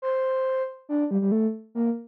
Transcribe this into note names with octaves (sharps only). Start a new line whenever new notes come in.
C5
D4
G3
G3
A3
A#3